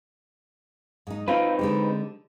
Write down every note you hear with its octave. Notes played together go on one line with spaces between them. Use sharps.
G#2 D#4
C4 D#4 F4 B4
D3 G#3 G4